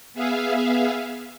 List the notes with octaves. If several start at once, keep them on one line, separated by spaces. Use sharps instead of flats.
B3 G#4 E5 F5